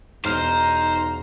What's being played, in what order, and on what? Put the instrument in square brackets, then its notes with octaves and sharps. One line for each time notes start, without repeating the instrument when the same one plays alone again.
[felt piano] E1 F6 [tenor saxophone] D#4 [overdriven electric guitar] C5 [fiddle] A#5